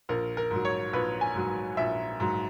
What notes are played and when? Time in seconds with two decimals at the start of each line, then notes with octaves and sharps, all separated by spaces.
0.09 A#1 A#4
0.37 A#4
0.51 G#2 F#3
0.65 C#5
0.93 A#1 B4
1.21 G#5
1.35 G#2 F#3
1.77 A#1 E5
2.20 G#2 F#3